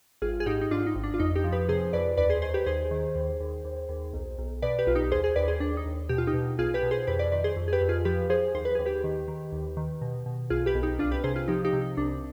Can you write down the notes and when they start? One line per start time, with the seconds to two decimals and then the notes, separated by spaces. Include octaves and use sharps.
0.22 G#1 F4 G#4
0.40 G#4
0.46 G#2 D#4 G4
0.61 D#4
0.71 G#2 D4 F4
0.87 D#4
0.95 G#1
1.04 D4
1.14 F4
1.19 F2 D#4
1.35 D#4 G4
1.44 F3
1.52 G4 B4
1.69 C3 G#4 C5
1.93 F2 B4 D5
2.17 D#2 B4 D5
2.30 G#4 C5
2.42 D#3 G#4 C5
2.54 G4 B4
2.66 D#2 G#4 C5
2.91 D#3
3.15 D#2
3.40 D#2
3.65 D#2
3.89 D#2
4.13 B1
4.38 B1
4.62 B2 B4 D5
4.78 G4 B4
4.87 B1 F4
4.95 D#4 G4
5.11 D#2 G#4 C5
5.24 G#4 C5
5.36 D#2 B4 D5
5.48 G#4 C5
5.60 D#2 D4
5.77 D#4
5.86 D#2
6.09 B2 G4
6.18 F4
6.27 D#4 G4
6.34 B2
6.59 B1 F4 G#4
6.74 G4 B4
6.83 B2
6.91 G#4 C5
7.07 F2 G4 B4
7.19 B4 D5
7.32 D#3 B4 D5
7.44 G#4 C5
7.56 F2
7.68 G#4
7.73 G4 B4
7.81 F2
7.89 F4 G#4
8.05 F3 G4 B4
8.29 F3 G#4 C5
8.54 D#2 C5
8.65 B4
8.75 D#2 G#4
8.85 G4 B4
9.04 D#3
9.28 D#3
9.52 D#2
9.77 D#3
10.02 B2
10.26 B2
10.50 B1 F4 G#4
10.66 G4 B4
10.75 B1
10.83 D#4 G4
10.99 C2 D4 F4
11.11 G4 B4
11.24 C3 G#4 C5
11.36 F4 G#4
11.48 F3 D#4 G4
11.64 D#4 G4
11.73 C3
11.81 D#4
11.97 C2 D4